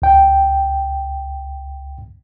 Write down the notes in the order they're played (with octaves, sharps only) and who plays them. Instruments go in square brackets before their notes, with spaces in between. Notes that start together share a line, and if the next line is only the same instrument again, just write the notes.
[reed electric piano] C#2 G5